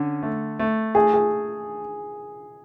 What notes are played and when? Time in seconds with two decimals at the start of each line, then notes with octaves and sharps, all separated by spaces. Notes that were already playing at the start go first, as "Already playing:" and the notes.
Already playing: D3 C#4
0.23 A3
0.59 A3
0.95 A3 G#4
1.14 G#4